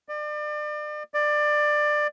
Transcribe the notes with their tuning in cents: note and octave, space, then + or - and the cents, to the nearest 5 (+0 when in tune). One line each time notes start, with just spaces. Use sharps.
D5 +35
D5 +20